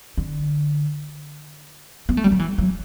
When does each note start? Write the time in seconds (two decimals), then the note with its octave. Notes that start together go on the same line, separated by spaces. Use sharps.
0.18 D3
2.09 B3
2.17 A3
2.24 G3
2.32 F#3
2.39 E3
2.58 F#3